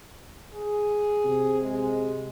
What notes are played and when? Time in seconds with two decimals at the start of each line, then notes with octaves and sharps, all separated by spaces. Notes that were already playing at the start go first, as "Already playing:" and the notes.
0.54 G#4
1.25 C3
1.62 G#3